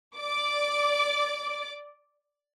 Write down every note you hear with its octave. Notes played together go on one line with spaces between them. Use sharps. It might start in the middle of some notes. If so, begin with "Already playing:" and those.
D5 D6